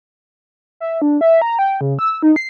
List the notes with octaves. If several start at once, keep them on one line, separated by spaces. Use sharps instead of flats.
E5
D4
E5
A#5
G5
C#3
E6
D#4
C7